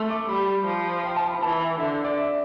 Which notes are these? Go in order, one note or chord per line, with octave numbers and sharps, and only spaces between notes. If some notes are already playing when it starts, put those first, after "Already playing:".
Already playing: A3 C6 E6
D6
G3 B5
F3
G5
A5
B5
E3 A5
E5
D3 E5
E5
D5
E5